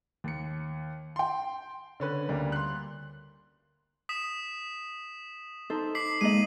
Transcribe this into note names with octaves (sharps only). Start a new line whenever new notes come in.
D#2 C#7
G5 C6
D3 C#4 B4
D2 G3 A#3
C6 F#6
D#6 B6 E7
D#4 A4 C5
D6 B6 C7 F#7
G#3 A#3 D#5 D#7 F#7